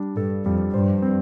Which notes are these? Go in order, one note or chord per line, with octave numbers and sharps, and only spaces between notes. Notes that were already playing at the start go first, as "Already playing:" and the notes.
Already playing: G3 D4
G2 A4
F2 G3
G2 C5
C4